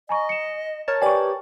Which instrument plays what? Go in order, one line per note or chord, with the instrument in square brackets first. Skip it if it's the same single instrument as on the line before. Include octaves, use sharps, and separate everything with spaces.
[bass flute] D#5 [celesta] G#5 A#5 C#6
[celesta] C#7 E7
[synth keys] A#4 C#5 A5
[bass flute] G4 [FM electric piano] B4 D5 G#5 [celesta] G5 C#6